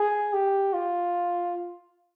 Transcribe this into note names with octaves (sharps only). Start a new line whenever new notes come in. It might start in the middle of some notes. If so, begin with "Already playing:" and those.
Already playing: G#4
G4
F4